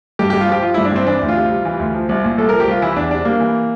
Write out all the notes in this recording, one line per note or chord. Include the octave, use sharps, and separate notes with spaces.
G2 G4
G2 G4
F4
F3 G4
F3 F4
G2 E4
D4
G2 C4
E3 D4
D2
F4
C3
G3
E3
D2
F3
C2
A#2
C2 A4
F3 A#4
G4
C2 F4
E3 E4
E2 D4
C3 D4
G3 A#3
E3